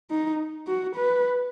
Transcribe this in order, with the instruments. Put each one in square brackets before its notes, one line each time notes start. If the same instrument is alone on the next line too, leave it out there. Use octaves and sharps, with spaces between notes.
[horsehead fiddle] D#4
F#4
B4